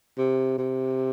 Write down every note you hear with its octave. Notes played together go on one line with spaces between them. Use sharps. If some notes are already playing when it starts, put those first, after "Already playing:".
C3
C3